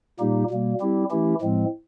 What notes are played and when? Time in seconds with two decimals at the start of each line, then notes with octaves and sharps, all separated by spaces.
0.20 A#2 G3 A#3 D#4 G4
0.51 B2 G3 A#3
0.80 G3 C4 E4 G4
1.11 E3 A3 C#4 E4 G4
1.41 A2 F3 G#3 C4